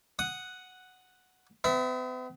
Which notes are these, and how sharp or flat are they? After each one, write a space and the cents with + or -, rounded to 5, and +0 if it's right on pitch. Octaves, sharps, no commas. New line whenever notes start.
F#5 +0 D#6 +0
B3 +45 E5 +0